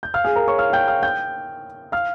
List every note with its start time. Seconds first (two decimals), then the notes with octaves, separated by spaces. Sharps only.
0.03 G6
0.14 F5 F6
0.24 G#4 G#5
0.36 A#4 A#5
0.48 C#5 C#6
0.58 F5 F6
0.73 G5 G6
0.88 F5 F6
1.03 G5 G6
1.92 F5 F6